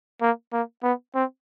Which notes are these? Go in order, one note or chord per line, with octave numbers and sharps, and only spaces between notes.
A#3
A#3
B3
C4